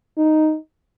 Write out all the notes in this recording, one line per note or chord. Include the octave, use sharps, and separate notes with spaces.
D#4